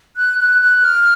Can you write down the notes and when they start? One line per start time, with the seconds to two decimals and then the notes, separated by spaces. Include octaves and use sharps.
0.17 F#6
0.39 F#6
0.62 F#6
0.84 F6